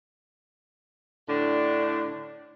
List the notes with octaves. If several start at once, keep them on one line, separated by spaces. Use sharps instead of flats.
A2 D3 D4